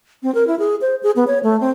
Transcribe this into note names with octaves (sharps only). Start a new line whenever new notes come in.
C4
A#4
E4
G#4
C5
G#4
B3
C#5
A3
C4